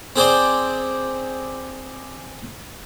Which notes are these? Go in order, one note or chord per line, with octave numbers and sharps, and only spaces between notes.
C4 G#4 C5 D5